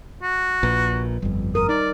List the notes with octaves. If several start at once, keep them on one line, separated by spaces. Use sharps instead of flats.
F#4
A#1 A#2 B4
G1 F2 G3
A#4 D#6
D#4 D5